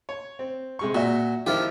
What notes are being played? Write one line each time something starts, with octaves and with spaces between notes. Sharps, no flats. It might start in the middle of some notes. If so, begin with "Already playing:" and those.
C#5
C4
C3 G#3 C#6
A#2 F#4 E5
D#3 F3 E4 F4 G4